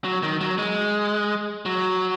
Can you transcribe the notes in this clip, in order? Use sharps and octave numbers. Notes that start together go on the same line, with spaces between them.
F#3
D#3
F#3
G#3
F#3